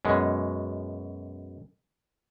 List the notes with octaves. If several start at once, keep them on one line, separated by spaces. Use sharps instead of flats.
F#2 B2 G#3